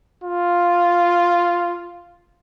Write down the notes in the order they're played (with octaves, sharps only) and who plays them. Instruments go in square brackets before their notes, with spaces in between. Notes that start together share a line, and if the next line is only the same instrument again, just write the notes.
[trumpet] F4